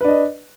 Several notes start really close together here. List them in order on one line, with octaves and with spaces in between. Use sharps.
B4 D4 D#5